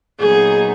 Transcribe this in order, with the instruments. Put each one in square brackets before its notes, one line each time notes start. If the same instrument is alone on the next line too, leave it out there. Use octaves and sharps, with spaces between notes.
[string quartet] A#2 F#3 B3 D#4 G#4